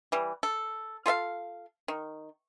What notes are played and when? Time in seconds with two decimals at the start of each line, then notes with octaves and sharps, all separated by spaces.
0.12 E3 G3
0.43 A4
1.06 F4 A4 E5 F5
1.88 D#3